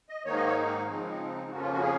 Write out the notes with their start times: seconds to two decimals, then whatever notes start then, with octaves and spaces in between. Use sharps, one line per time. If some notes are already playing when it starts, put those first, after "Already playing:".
0.09 D#5
0.25 G#2 D#3 A#3 D#4 C#5
0.36 D#5
0.46 C#5
0.88 C#3 F3 G#3 C4 D#4
1.51 F2 C#3 F3 A#3 C#4 F#4
1.62 F4
1.72 F#4
1.82 G#4